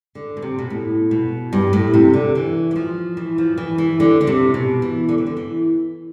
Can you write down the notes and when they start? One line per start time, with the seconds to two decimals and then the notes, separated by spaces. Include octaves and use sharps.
0.15 D3
0.37 B2
0.42 C3
0.59 B2
0.70 A2
1.11 B2
1.53 G2
1.73 A2
1.94 C3
2.14 D3
2.35 E3
2.71 E3
2.76 F3
3.17 E3
3.38 F3
3.57 E3
3.78 E3
4.00 D3
4.21 D3
4.27 C3
4.54 B2
4.82 E3
5.09 D3
5.18 E3
5.27 D3
5.37 E3